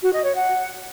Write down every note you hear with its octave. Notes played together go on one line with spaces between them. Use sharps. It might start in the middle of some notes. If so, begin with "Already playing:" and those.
F#4
D#5
C#5
F#5